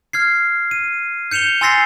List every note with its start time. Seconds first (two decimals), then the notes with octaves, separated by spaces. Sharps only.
0.13 F6 G#6 C7
0.71 D#7
1.31 G6 C#7 E7 F7 G7
1.61 G#5 C6 E6 A6 A#6 C7